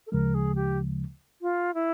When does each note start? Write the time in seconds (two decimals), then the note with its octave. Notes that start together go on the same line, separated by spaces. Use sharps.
0.07 A4
0.12 D2 C#3 F3 G#3 A#4
0.34 G#4
0.55 G4
1.42 F4
1.74 E4